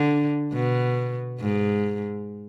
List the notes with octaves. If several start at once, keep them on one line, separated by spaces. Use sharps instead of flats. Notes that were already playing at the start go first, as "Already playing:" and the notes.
Already playing: D3
B2
G#2